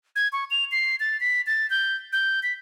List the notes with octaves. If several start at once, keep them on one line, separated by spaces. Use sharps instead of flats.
G#6
C#6
F7
C7
A6
B6
A6
G6
G6
B6